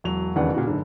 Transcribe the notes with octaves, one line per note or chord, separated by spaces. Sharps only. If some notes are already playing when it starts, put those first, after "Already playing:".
E1 F#3 F7
E1 D#2 C#3 D4 B4 F#5
A#2 C#3 F#4
F#1 G#2 D3